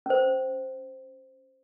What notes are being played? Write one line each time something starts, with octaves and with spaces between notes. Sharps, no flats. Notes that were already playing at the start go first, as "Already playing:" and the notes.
C#4 C5